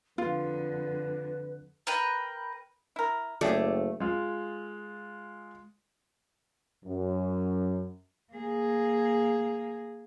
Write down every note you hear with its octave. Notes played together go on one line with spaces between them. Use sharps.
F2 D3 F4 B4
A#4 B4 G5
E4 A#4
F#1 A3 G4 G#4 D5
G#3 F4
F#2
A#3 G#4